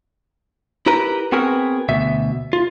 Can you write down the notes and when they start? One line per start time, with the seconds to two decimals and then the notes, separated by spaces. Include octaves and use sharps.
0.86 E4 G4 A#4 B4 A#5
1.32 B3 C4 F#4 G#4 A#4 B4
1.89 D2 B2 E5
2.53 F4